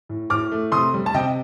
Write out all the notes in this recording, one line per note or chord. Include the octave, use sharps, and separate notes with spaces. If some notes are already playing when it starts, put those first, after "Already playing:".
A2
A2 D6 F6
A3
C3 C6 D#6
G3
A5
C3 D#5 G5